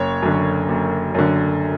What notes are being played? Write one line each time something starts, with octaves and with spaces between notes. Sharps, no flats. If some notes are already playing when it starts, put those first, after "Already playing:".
Already playing: F#1 C#5
F#2 D3
F#1
F#2 D3